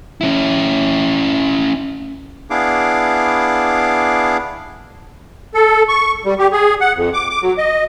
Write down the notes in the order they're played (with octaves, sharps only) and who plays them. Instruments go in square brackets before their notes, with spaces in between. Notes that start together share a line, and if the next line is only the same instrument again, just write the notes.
[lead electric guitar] C#4 E4
[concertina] B3 D4 E4 G#4 F5 D6
[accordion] A4
C#6
G3
G4
G#4
F#5
F2
D6
D6
F#3
D#5